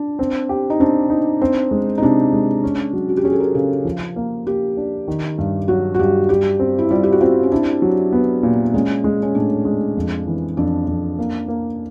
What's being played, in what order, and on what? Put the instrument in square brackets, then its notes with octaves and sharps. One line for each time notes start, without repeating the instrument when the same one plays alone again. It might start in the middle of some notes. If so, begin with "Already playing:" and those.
Already playing: [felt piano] D4
[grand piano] C4
G4
[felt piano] D#4
[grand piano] C4 [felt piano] D4
[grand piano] D#4
C4
G#3
[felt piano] D#4
[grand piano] C3 [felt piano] D4
[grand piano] G#3
C#4
F#3
[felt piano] F#4
G4
[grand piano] C#4 [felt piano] G#4
[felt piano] A4
A#4
[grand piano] C#3 [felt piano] A4
[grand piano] F3
A#3
[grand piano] A#3 [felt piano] G4
[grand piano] D4
D#3
G2
[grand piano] F#3 [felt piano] F#4
[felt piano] F#4
[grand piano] G2 [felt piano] G4
[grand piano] G3 [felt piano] G4
[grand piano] C4
[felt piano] E4
[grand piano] G3 [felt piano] F4
[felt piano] G4
F#4
[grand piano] C4 [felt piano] F4
[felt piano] C#4
[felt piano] D4 [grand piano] E4
[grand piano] F#3
B3
A#2
[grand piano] G#3 [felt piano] C#4
[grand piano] G#3
[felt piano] C#4
[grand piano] A2 [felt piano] D4
[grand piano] G#3
F2
E3
[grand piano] F2 [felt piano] D4
[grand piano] F2
A#3
A#3